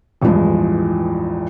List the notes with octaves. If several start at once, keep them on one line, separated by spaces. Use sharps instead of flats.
A1 E2 G2 F3 G#3